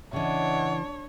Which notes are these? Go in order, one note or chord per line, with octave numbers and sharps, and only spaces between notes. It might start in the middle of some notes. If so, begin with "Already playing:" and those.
C#3 E3 D4 C#5 D#5 E5 F#5